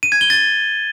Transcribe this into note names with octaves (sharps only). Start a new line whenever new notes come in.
D#7
G#6
G7
A6